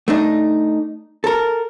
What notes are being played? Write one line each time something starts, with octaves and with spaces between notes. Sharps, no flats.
A3 D4 D#4
A4 A#4